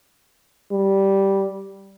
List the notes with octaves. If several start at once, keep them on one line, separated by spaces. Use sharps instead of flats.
G3